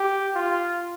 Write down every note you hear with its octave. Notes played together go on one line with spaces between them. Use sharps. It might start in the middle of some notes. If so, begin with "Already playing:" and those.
Already playing: G4
F4